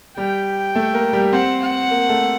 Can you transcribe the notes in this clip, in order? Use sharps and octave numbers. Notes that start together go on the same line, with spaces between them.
G3 G4 G5
A3 A4
A#3 A#4
G3 G4
C4 C5 F#5
F#5
A#3 A#4
A3 A4